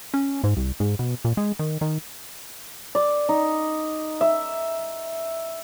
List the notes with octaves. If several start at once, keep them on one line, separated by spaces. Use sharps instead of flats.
C#4
G#2
C2
G#2
B2
A#2
G#3
D#3
D#3
D5
D#4
E5